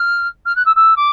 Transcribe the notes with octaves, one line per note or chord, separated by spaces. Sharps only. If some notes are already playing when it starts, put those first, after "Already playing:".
Already playing: F6
F6
F#6
E6
E6
D6